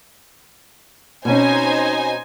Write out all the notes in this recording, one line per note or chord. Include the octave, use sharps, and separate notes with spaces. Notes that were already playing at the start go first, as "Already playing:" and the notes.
B2 C4 C#4 D#4 C5 G#5